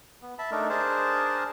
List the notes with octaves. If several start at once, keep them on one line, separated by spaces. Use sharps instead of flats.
B3
E5 A5 B5
A3 D4 D#4 A#4
D4 G#4 A#4 C5 A5